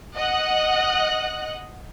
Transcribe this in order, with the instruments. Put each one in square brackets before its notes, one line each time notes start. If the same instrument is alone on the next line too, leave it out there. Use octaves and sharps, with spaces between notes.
[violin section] D#5 F#5 F#6